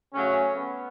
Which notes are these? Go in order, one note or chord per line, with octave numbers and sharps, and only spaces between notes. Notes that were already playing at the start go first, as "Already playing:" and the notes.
C#3 F#3 A3 C#4
B3